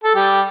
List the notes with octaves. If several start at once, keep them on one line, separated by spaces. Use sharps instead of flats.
A4
G3 G4